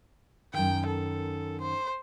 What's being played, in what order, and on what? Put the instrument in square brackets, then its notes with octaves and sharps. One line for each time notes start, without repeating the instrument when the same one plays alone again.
[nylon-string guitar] F#2 D#3 [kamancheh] G5
[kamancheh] A4
C5